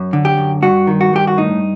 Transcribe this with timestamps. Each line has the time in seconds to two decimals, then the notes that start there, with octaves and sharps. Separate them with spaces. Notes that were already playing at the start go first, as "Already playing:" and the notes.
Already playing: F#2
0.13 D3
0.25 G4
0.37 F#2
0.62 G2 F#4
0.87 D#3
1.01 F#4
1.13 G2 G4
1.27 F#4
1.37 A2 D#4